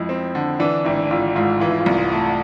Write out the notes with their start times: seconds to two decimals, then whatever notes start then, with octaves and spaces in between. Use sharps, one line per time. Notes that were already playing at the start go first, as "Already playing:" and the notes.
Already playing: F2 G#3 E4
0.09 C4
0.35 D3
0.60 E3 D4
0.85 G#1 E4
1.10 G#1 F4
1.36 G#2 F4
1.60 E3 F4
1.71 E4
1.81 F4
1.86 C2
2.12 A3